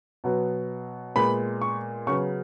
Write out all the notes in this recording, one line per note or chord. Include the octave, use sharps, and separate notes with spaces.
B2 F#3 B3
A#2 G#3 B3 B5
C#6
C#3 F#3 B3 C#6